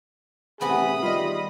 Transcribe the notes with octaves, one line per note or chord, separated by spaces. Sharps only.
A1 C3 A3 B3 F#4 G#4 B5 D#6
D#3 G3 F4 D#5